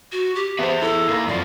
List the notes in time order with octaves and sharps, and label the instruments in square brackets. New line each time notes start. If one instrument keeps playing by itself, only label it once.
[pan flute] F#4
G4
[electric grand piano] B3 C5 [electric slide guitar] G#4 E5
[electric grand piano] E4 [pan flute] A4
[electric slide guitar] A#3 D#4 A#4
[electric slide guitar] F#2 F3 [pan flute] D5